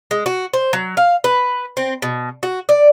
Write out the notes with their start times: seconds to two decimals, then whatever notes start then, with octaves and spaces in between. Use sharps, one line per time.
0.11 G#3
0.26 F#4
0.54 C5
0.73 F#3
0.97 F5
1.24 B4
1.77 C4
2.02 B2
2.43 F#4
2.69 D5